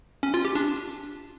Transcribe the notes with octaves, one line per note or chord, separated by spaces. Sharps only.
C#4
F4
G4
D4